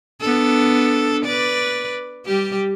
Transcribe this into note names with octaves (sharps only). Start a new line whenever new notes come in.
B3 D4 A4
B4 D5
G3 G4